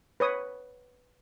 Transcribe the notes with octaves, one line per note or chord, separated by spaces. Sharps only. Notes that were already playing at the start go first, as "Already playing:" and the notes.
B4 C#5 D#6